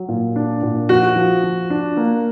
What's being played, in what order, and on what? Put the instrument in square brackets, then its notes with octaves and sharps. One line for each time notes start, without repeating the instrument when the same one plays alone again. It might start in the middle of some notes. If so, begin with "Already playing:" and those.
Already playing: [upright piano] F#3
A#2
D4
A#2
[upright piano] F3 [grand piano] F#4
[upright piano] F3
F3
D4
A#3